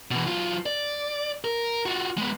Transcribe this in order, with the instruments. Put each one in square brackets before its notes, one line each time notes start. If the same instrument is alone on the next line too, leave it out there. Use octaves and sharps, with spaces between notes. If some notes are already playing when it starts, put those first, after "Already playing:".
[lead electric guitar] B2 E3
F#3 F4
D5
A#4
F4 F#4
G#3 B3